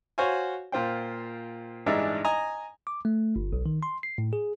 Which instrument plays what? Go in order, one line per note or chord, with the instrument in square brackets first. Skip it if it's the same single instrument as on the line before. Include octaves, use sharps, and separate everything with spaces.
[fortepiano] F#4 C5 C#5 F5 G#5
A#2 F4 C5 G5
A1 G2 G#3 D4 D#4 E5
D#5 G#5 A#5
[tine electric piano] D6
A3
G1
B1
D#3
C6
C7
A2
G#4